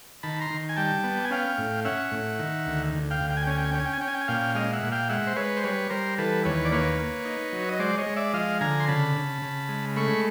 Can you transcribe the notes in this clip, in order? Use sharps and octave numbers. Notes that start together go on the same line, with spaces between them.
D#3 A5 B5
A#5 C6
D#3
G#5
G3 G5 A5
B3
G#5
C#4 F5 G5
A2
C#4 E5 F#5
A2
D#3
D2
D2
F5 G5
D2
G5
G#5
G5
C#4 G#5
G5
G#5
G5
C#4
G#5
G5
G#5
C#4 G5
G#5
G5
G#5
A#2 F5 G5
G#3 D#5 F5
E5 F#5
A#2
F5 G5
G#3 E5 F#5
C5
G#3 B4 C#5
C5
G3 B4 C#5
G3 A#4 C5
E3 A4 B4
D#2 B4 C#5
D5
A#3 B4 C#5
A#3
D#4
F#3
D#5
G#3 C5 D5
C#5 D#5
G#3
D5 E5
F3 D#5 F5
D3 G#5 A#5
C6
C#3 A5 B5
C#3
C#3
G#3
A3 B5 C#6